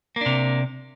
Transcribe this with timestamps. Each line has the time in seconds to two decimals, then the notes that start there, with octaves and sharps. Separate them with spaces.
0.16 A#3
0.21 D4
0.26 C3